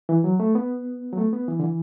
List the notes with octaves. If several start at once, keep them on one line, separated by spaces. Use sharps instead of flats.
E3
F#3
A3
B3
F#3
A3
B3
E3
D3
E3